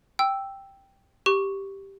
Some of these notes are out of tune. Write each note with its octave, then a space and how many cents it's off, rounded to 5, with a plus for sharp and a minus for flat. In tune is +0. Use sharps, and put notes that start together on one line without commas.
G5 +0 E6 +0
G4 +0 C#6 +0